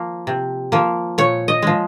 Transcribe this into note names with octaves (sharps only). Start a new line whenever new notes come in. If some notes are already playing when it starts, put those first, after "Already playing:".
Already playing: F3 A#3
C3
F3 A#3
A#2 C#5
D#5
F3 G#3